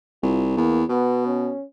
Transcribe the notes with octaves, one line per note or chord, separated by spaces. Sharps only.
C2 F4
E2 A#3
B2 B3
C#4